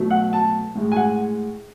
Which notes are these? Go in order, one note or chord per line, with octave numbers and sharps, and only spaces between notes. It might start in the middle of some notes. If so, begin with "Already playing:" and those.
Already playing: B2 F#3 A3
F#5
A5
A2 G#3
G#5
F#5